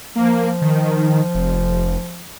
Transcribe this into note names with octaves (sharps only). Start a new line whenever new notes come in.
F3 A#3
D#3
F1